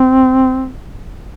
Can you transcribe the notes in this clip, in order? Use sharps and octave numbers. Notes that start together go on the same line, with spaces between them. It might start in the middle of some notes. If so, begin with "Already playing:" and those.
Already playing: C4